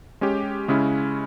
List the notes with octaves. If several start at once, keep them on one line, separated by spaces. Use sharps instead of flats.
G#3 C#4 G4
C#3 G#3 C#4 E4